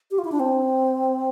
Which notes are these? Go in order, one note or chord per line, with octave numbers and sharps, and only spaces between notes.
G4
F4
E4
D4
C4